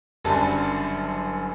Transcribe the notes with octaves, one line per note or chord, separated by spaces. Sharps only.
F#1 F#2 D3 G3 A5